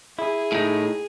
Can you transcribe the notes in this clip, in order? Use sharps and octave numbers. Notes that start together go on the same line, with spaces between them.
E4 G#4
A2 D#4